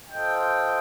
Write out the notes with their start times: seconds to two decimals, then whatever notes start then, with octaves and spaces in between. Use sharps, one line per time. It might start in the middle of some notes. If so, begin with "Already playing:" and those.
0.10 F4 A4 C5 D#5 G5